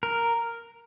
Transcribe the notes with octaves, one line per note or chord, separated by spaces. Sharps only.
A#4